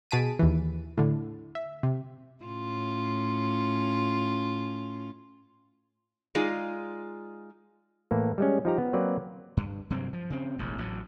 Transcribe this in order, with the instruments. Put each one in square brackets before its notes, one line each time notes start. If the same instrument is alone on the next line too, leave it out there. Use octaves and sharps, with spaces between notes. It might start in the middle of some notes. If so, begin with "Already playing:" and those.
[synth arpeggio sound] B2 G#4 A5 B6 D7 D#7
D#2 E3
A2 D3
E5
C3
[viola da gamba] A2 C#4 F4
[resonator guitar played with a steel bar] G#3 D#4 F4 G#4 D5
[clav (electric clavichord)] A2 E3 A#3
G3 G#3 C#4
F3 D#4 G4 A#5
B3
F#3 A#3 C4 B4 D5
[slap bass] G2
G2 C3 F#3 C4
F3
C#3 C4
E1 A1 E2
A1 A2 F#3